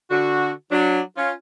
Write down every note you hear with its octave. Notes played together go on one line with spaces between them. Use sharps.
D3 F#4
F#3 D4
C#4 F4